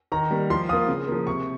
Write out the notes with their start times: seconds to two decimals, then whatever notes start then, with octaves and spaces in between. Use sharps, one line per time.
0.12 D#3 A#5
0.31 G3 A#3
0.50 F3 C6
0.69 A#3 F4 D#6
0.88 C#3
1.08 F3 A#3
1.27 C3 C#6